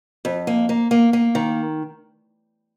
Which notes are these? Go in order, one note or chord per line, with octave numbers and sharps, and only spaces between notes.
F2
A#3
A#3
A#3
A#3
D#3